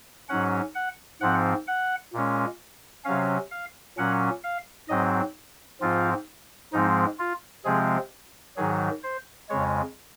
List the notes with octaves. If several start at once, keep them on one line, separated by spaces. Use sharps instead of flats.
G#2 F#3 C#4 F#5
F#5
G#2 F3 C4 F#5
F#5
A#2 G#3 C#4
C3 F#3 C#4 F5
F5
A#2 F#3 C#4 F#5
F5
G#2 F#3 C4 D#5
G#2 F3 C4 F4
G#2 F3 G#3 C4 D#4
F4
C3 F3 G#3 C4 G#4
G#2 D#3 F#3 G#4
C5
F2 C#3 G#3 C#5